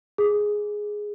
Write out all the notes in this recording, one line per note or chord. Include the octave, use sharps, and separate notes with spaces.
G#4